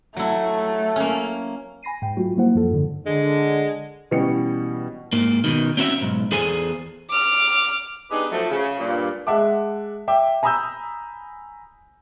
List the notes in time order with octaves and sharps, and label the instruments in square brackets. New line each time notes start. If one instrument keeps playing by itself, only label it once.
[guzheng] F#3 E4 [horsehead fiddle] A3
[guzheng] A#3 C#4
[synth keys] G#5 B5 A#6 C7 D#7
G#2 G5
G#2 F#3 A3 F4 F#4
F#3 G3 A#3 E4 C5 F#5
F#2 F3 F4 A4
G#2 D3
[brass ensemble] D3 [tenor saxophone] G#3
[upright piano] B2 E3 G3 C#4 C#7
[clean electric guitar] G#2 A#3
B2 D#3
C4 C#4 F#4 C5 E5
B1 G#2
E2 G#4 A4 C5 G#5
[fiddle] D6 F6
[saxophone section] B3 D4 D#4 G4 G#4 B4
F3 F#3 A3
C#3
G2 A#2
[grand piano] G#3 E5 F#5 A5 D6
E5 G5 D6
G#5 A#5 B5 D#6 E6 G6